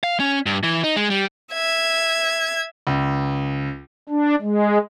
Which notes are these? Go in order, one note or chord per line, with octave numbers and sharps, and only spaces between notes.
F5
C#4
G2
E3
D#4
G#3
G3
E5 G#6
C#2
D4
G#3